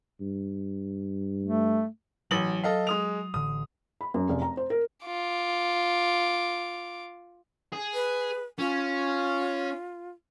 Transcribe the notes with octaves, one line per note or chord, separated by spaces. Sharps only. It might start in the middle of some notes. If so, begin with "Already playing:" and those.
G2
A3
A1 F#3 F#7
A4 D#5 F5
G#3 D#6 F7
A1 D3 D#6
B5
F#2
F1
A#5
C5
A#4
F4 D6
G#4
B4
C#4 F4